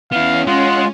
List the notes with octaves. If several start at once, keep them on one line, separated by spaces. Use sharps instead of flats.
B3 C#4 E4 F5
G#3 C#4 F4 F#5